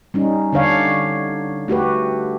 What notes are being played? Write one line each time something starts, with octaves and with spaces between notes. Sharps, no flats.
G3 C#4 D#4
D3 D4 C#5 F5
A3 F#4 G4 B4